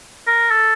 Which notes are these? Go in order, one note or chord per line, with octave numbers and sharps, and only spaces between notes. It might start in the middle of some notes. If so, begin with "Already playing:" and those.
A#4
A4